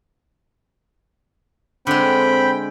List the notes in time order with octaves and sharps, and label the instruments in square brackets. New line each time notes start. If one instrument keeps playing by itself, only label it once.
[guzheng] D3 G#3 [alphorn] C4 [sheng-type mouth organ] G5 B5